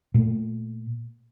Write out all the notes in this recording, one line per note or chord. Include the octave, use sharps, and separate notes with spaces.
A#2 A3